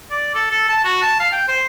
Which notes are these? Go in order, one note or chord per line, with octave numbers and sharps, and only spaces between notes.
D5
A4
A4
A5
F#4
A5
F5
G5
C5